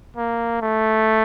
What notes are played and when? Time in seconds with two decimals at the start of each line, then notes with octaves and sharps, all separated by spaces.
0.17 A#3
0.62 A3